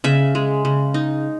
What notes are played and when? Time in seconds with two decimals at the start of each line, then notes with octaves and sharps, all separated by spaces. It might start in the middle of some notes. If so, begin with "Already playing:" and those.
0.04 C#3 E5
0.35 G#3
0.65 C#3
0.94 D#4